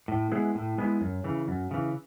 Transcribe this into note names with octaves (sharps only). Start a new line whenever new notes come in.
A2
G#3 B3 E4 G#4
A2
G#3 B3 E4 G#4
F#2
C#3 E3
F#2
C#3 E3